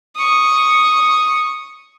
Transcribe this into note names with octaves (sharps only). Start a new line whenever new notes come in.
C#6 D#6